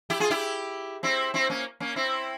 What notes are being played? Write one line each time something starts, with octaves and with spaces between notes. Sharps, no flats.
E4 G4
F4 G#4
E4 G4
C4 E4
C4 E4
A#3 C#4
A#3 C#4
C4 E4